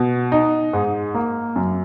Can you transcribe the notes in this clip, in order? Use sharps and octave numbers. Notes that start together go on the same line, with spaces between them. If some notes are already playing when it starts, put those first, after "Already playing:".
Already playing: B2
D#4
G#2
A#3
F#2